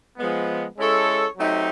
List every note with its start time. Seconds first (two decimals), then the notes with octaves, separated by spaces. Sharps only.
0.17 F3 G#3 B3
0.77 G#3 C#4 E4 A4 C#5
1.37 F#3 A3 C4 D#4 G4